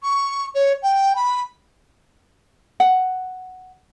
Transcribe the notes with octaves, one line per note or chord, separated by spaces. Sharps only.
C#6
C#5
G5
B5
F#5